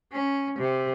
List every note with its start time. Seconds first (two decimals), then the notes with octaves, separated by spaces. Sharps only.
0.13 C#4
0.59 C3